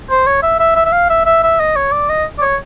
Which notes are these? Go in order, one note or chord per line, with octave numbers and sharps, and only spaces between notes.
C5
C#5
E5
E5
E5
E5
F5
E5
E5
E5
D#5
C#5
D5
D#5
D5
C#5